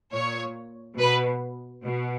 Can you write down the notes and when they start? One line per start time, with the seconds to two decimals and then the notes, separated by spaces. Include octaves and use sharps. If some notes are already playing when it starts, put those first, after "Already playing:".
0.13 A#2 C#5
0.99 B2 B4
1.85 B2